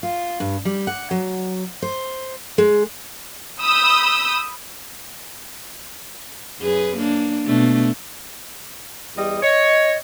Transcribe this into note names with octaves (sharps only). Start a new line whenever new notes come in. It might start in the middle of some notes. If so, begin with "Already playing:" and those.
F4
G2
G3
F#5
F#3
C5
G#3
B5 D#6 E6 G6
F#2 G#4 B4
A#3 D4
B2 A3 D4
E2 G3 D#5
C#5 D#5